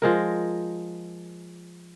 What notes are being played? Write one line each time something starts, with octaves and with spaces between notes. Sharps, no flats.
F3 G#3 A#4